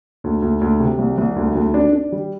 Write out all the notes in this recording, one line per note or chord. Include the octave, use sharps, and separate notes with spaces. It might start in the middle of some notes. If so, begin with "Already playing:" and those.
D2
D2
D2
C3
C2
C2
D2
D2
D4
D4
G3